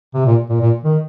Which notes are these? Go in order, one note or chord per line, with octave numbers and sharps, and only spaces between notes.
C3
A#2
A#2
A#2
D#3